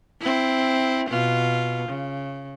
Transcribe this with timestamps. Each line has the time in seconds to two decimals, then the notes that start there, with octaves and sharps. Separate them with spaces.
0.21 C4 E4
1.09 B2 F4
1.89 C#3